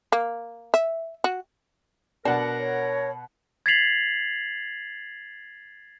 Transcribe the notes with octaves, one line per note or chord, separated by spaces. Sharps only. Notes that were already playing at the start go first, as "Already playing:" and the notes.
A#3
E5
F#4
B2 D4 A#4 F#5 A5
C#5
G#6 A6 B6 C7 F7 F#7